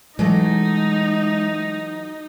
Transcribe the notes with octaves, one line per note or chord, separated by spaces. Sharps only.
E3 F#3 G#3 A3 D#4